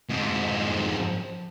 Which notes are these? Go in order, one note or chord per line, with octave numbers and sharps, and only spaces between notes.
F2 G#2